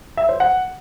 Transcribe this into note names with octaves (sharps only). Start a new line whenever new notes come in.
E5
C5
F#5